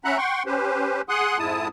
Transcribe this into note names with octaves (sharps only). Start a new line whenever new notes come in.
C#4 E5 F#5 A#5 B5 F#6
F#5 G5 C6 C#6
C#4 G4 B4 C5
G#4 F#5 C6 D#6 F#6
F2 G#2 G#3 E4 A5 D#6